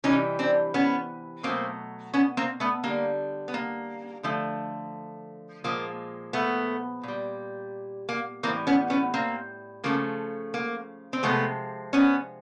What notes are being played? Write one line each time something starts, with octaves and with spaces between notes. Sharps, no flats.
C3 E3 G3 C#4 D#4
C4 D4
B3 C#4
B2 F#3 A3 A#3 C4
B3 C#4
A#3 C4
A3 B3
D3 G3 A#3
B3
A#3
D3 F3 A3
A#2 F3 G#3 A#3
A3 B3
A#2 G3
A#3
A2 E3 G3 A#3 C4
B3 C#4
B3 C#4
A#3 C4
C#3 F3 A3 A#3
A#3
C4
C3 F3 G#3 A3 B3
B3 C#4